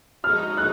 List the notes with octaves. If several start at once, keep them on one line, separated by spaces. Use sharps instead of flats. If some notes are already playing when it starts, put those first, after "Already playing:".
F3 G#3 D#4 F#4 F6
F#6